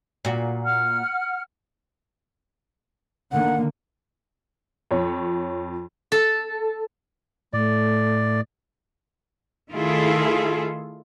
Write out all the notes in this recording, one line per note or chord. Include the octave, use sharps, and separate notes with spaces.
A#2 F#4
F#5 F6
D3 D#3 A#3 F#5
F2 F3 C#5
A4
A2 A3 D5
D#3 A3 E4 F4 G#4 A4